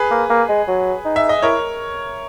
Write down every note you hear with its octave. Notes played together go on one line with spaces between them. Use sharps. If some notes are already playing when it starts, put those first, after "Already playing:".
Already playing: G#4 B4
A#3
A#3
G#3
F#3
D#4
E5
D#5
E4 A#4 C#5